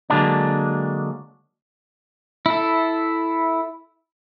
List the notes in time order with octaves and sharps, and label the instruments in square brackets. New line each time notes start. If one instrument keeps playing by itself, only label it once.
[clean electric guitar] D3 F#3 G#3 A#3 D4
[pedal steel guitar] E4 A4